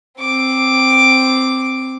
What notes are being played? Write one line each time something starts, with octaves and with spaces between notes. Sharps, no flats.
C4 D6